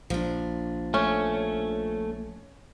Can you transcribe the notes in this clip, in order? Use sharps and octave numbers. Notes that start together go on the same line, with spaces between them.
A#1 F3 D4
A3 C#4